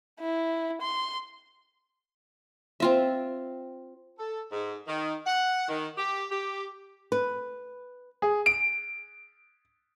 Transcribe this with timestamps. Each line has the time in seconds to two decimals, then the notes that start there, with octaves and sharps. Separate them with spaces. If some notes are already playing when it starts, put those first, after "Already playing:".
0.20 E4
0.82 C6
2.80 C4 F4 E5
4.18 A4
4.52 G#2
4.87 D#3
5.25 F#5
5.68 D#3
5.98 G4
6.31 G4
7.12 B4
8.22 G#4
8.46 D7